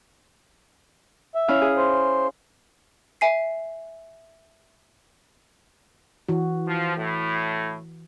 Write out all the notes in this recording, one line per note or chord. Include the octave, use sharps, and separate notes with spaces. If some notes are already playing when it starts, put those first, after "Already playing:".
E5
C#4 E4 F5
G#4
C5
E5 G#5 C7
E3 F#4
F3
A2